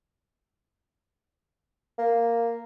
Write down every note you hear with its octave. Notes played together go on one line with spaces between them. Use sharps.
A#3